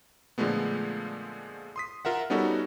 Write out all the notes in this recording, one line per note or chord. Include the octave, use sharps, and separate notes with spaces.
A#2 D3 F3 G#3 A3 B3
C6 D#6 B6
F4 A#4 E5 F#5
G3 B3 C#4 D#4 F#4 A4